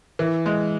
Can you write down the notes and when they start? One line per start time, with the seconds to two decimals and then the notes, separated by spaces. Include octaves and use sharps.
0.19 E3
0.46 G#3